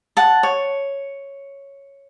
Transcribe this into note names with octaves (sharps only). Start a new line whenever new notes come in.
F#5 A5
C#5